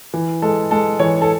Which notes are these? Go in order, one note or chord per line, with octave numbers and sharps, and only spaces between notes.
E3
G#3 A4
G#3 A4
E3 C#5
A4